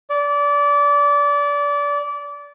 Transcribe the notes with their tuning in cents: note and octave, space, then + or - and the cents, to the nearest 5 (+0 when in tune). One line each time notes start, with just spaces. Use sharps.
D5 -25